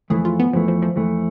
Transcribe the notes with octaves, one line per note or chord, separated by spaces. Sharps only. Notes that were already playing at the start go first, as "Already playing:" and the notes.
F2 E3 A3 G#4
F4
B3
F2 E3 F3 A3
F3
F3
F2 E3 A3